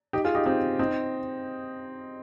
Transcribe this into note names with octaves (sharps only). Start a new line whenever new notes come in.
D#4 G4
F4 G#4
D#4 G4
C4 D#4
C4 D#4